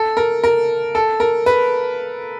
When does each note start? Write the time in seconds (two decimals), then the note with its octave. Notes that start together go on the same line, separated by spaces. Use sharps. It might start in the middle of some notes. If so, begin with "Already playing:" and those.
Already playing: A4
0.17 A#4
0.44 A#4
0.95 A4
1.20 A#4
1.46 B4